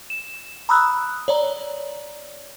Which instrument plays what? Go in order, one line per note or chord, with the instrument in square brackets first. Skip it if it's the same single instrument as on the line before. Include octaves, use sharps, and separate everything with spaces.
[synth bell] E7
A#5 B5 D#6 E6 F#6
C#5 D5 A#5